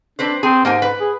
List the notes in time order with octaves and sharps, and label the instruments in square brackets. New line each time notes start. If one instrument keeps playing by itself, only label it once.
[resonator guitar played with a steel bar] C4 B4 C5 [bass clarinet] D4
[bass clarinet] C4 [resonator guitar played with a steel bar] G#4 G#5
[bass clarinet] G#2 [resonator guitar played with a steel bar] A#3 G4 G#5
[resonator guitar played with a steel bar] B4
[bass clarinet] G#4